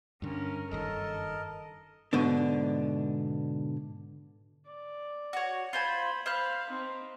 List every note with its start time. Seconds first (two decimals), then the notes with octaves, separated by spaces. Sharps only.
0.22 G2 D3 C#4 A#4
0.71 F#1 G2 D#3 A4 A#4 D#5
2.13 G#2 B2 D3 D4
4.67 D5
5.33 F#4 C#5
5.73 F4 C5 G#5 B5
6.26 C5 F5 B5 F6 F#6
6.70 C4 D#4